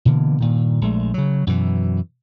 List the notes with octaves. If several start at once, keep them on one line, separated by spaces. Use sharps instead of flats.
B2 D3 E3 A#3
G2 A#2 D#3
A#1 G#3 A3
C#3 F#3
F#2 B2 E3